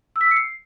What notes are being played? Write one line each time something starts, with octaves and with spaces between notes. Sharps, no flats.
E6
B6
E6
C#7
C7